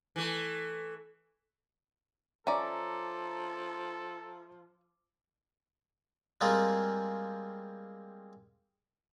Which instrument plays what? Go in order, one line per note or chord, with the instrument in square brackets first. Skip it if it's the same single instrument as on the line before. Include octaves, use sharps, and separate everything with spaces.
[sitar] E3 A3
[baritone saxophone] F3 [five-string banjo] C#4 D5 [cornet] A4 [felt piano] E5 A#5 D6
[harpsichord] G3 G#3 A#3 C4 F4 G#4